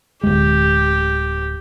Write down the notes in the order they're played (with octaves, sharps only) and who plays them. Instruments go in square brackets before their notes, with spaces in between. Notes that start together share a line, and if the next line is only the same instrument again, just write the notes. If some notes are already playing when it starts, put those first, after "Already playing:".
[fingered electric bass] D1 G#3 [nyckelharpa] G4